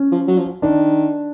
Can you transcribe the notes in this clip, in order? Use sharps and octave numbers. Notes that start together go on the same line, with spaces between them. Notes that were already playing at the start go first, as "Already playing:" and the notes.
Already playing: C#4
F3
F#3
F3
D#3 D4